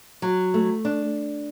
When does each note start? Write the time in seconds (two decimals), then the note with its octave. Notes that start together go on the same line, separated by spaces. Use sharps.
0.22 F#3
0.54 A3
0.85 D4